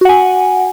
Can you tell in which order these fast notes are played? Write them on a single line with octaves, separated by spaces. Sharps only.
F#4 F#5 G#5